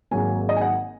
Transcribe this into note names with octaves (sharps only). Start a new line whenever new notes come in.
G#1 G#2 F#3 A#3 G#5
D#5
G#5
F#5